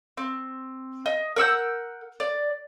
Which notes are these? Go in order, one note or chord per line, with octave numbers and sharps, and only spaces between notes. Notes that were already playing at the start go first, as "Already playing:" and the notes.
C4
D#5
A#4 F#5 E6 G6
D5